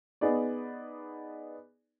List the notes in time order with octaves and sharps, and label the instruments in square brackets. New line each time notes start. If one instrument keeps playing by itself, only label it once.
[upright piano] B3 D#4 G#4 D5